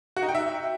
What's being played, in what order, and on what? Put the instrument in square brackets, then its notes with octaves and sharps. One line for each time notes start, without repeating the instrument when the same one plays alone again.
[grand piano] F#4
D#4
G5
E5